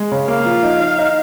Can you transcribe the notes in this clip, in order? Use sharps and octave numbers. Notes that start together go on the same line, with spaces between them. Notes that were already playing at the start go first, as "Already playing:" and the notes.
Already playing: G#3
C#3
A#3 F5
F3
D#4
D#4
D#4